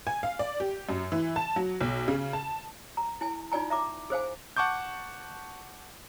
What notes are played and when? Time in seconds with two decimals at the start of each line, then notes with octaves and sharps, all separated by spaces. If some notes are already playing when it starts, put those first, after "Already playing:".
0.07 G#5
0.23 F5
0.39 D5
0.60 G4
0.89 F#2
1.12 E3
1.36 A5
1.56 F#3
1.81 B1
2.08 C#3
2.33 A5
2.97 A#5
3.21 E4 G#5
3.52 D#4 F4 D5 G#5 A#5
3.70 E5 A#5 D6
4.10 G#4 C5 F5 G#5
4.57 F#5 A5 C#6 D6 G6